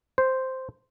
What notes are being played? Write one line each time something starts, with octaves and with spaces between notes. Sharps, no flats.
C5